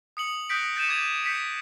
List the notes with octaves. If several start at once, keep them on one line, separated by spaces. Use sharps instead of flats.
D#6 C#7 F#7
D#6 F#6 G6 A#6 B6 D7
G6 A6 C#7 D#7 E7
D6 G#6 A6 F7
G6 B6 C#7